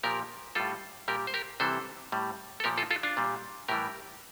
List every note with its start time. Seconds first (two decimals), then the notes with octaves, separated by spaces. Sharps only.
0.03 A#2 F3 G4 A#4
0.55 A2 G3 F4 A4
1.08 A#2 G3 G4 A#4
1.27 C5
1.34 G4 A#4
1.60 C3 E3 G3 A4 C5
2.12 A2 G3
2.60 A4
2.64 A#2 F3 G4 A#4
2.78 F4 A4
2.91 F4 A4
3.03 D4 F4
3.17 A#2 G3
3.68 A2 E3 G3 G4 A#4